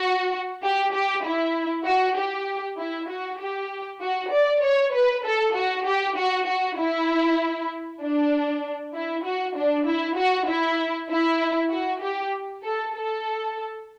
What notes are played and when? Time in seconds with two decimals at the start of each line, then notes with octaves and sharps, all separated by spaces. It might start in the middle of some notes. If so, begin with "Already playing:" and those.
Already playing: F#4
0.62 G4
0.93 G4
1.24 E4
1.86 F#4
2.17 G4
2.78 E4
3.09 F#4
3.39 G4
4.01 F#4
4.32 D5
4.63 C#5
4.94 B4
5.25 A4
5.55 F#4
5.86 G4
6.17 F#4
6.47 F#4
6.78 E4
8.02 D4
8.94 E4
9.24 F#4
9.56 D4
9.86 E4
10.17 F#4
10.47 E4
11.10 E4
11.71 F#4
12.02 G4
12.63 A4
12.95 A4